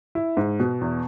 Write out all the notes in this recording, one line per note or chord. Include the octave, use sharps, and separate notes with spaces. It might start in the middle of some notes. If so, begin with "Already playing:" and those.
E4
G#2
B2
E2